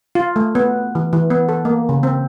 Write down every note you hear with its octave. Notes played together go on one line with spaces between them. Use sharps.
F4
A3
B3
E3
E3
B3
A4
A#3
C#3
C4